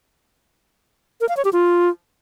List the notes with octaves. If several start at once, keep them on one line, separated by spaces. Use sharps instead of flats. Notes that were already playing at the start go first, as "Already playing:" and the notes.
A#4
F5
C#5
G4
F4